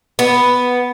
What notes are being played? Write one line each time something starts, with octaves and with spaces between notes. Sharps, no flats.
B3